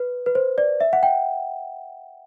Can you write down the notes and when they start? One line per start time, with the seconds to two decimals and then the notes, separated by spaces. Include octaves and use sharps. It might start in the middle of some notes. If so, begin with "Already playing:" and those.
Already playing: B4
0.26 B4
0.35 C5
0.58 D5
0.81 E5
0.93 F#5
1.03 G5